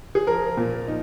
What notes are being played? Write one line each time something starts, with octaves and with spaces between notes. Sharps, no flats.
G#4
F3 A#4
A#2
D#4